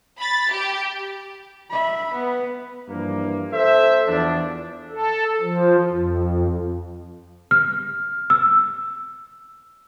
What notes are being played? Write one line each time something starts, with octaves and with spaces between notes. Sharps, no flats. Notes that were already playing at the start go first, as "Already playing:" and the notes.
B5 A6
G4
E5 B5
B3
G2 E3 F3 A#3
A4 C5 E5
E2 F3 D4
A4
F3
F2
F6
E6